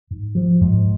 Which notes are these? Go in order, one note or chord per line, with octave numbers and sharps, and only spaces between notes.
G#2
F3
G#2